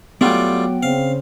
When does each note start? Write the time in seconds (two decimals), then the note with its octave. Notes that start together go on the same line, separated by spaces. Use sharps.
0.21 F#3 G3 A3 B3 F4 F#5 G5
0.83 C#3 C4 F5